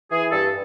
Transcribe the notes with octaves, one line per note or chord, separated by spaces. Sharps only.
E3 G#4
G2 A4